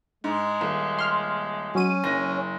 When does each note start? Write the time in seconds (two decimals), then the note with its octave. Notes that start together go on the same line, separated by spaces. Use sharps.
0.24 G#2 G#3
0.61 D#1
0.99 C6 F6
1.75 F#3 C#4 D#7
2.04 F#1 A#6